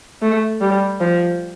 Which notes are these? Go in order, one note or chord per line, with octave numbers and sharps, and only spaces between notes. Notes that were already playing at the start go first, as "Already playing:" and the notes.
A3
G3
F3